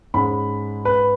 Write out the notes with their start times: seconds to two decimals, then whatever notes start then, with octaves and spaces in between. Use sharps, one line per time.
0.14 G#2 G#3 C#4 B5
0.85 B4